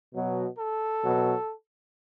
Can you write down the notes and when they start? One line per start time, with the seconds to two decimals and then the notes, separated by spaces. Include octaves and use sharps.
0.14 B2 F#3
0.59 A4
1.03 B2 F#3